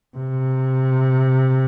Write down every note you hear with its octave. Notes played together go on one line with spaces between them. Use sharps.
C3